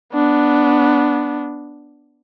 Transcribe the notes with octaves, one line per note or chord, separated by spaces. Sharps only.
B3 D4